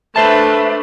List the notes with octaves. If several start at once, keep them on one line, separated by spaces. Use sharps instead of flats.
A3 D4 A4 B4 C5 E5 A5